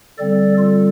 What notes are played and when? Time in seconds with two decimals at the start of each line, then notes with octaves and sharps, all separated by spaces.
0.18 D3 G3 C4 A4 D5
0.58 F4 A4